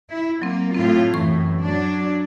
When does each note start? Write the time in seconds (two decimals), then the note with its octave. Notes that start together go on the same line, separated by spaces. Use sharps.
0.10 E4
0.42 F#3 A#3 C4
0.74 A2 C4 F4
1.14 F#2 A2 E3 C#6
1.62 F#3 D4